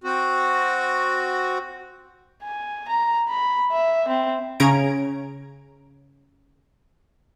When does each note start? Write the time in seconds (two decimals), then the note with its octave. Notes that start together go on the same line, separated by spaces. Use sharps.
0.04 C4 F#4
2.44 G#5
2.88 A#5
3.29 B5
3.72 E5
4.08 C4
4.60 C#3 C#4 A#5 G#6 D7